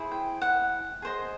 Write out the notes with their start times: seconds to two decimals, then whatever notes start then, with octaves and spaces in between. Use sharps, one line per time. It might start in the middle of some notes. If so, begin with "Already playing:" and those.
Already playing: E4 G#4 C5
0.12 G5
0.41 F#5
1.02 G#4 C5 D#5